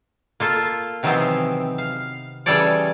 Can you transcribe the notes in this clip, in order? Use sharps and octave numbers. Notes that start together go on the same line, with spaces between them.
A#3 F4 A4
C3 D#3 E3 F#3 B3 C4
F5
C#3 E3 G3 A4 C#5 D5